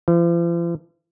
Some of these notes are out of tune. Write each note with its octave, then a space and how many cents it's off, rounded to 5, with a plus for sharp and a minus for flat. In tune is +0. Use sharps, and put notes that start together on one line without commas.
F3 -45